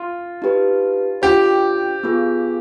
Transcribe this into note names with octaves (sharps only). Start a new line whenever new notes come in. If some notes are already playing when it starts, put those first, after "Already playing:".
Already playing: F4
D#4 G4 B4
D4 F4 G4 C5 G5
B3 F4 G#4